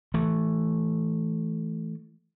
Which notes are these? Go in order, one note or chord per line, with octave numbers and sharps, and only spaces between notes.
E3 A3